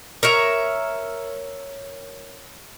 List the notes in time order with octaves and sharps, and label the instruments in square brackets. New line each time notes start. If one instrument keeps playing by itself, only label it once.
[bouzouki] A#4 C#5 E5